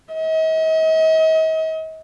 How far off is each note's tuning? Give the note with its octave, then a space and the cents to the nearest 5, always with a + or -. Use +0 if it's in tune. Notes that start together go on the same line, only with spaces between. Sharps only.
D#5 +40